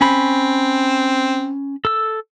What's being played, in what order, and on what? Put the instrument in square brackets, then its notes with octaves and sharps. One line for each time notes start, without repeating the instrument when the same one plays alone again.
[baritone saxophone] C4 [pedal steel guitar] C#4 B5
[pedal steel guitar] A4 E6